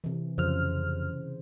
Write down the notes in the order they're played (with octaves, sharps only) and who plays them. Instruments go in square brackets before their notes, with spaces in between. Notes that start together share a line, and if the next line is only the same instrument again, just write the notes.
[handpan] C3 E3
[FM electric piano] F2 F6 [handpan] C#3 C5